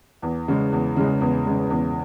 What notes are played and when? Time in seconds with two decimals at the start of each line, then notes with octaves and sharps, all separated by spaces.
0.22 E2
0.48 C#3 G#3
0.72 E2
0.97 C#3 G#3
1.21 E2
1.46 C#3 G#3
1.70 E2